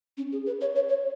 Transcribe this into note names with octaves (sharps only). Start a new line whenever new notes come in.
C#4
G#4
B4
C#5
C#5
C#5